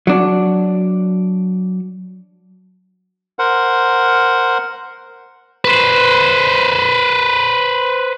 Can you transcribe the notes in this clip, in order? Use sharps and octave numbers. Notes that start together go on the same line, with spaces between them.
F#3 D4
A#4 C5 F#5
B4 C5